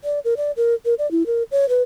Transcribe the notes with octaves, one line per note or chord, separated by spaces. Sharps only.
D5
A#4
D5
A#4
A#4
D5
E4
A#4
C#5
B4